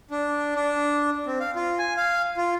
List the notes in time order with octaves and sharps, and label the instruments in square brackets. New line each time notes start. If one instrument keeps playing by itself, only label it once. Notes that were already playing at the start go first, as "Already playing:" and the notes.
[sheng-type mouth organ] D4
D4
C4
F5
F4
G#5
F5
F4